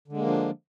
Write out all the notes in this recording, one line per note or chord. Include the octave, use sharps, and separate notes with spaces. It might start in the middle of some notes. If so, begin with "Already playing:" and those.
D3 F3 G#3 A#3 D4